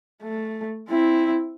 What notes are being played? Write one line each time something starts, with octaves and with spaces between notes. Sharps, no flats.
A3
C4 E4